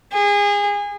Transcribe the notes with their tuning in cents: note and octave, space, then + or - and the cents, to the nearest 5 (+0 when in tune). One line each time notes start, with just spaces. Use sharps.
G#4 -30